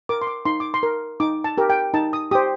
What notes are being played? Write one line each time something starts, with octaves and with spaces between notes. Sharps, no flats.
A#4 D6
C6
D6
D#4 C6
D6
C6
A#4
D#4 D6
A5
G4 A#4
G5
D#4 A5
D#6
G4 C5 D#6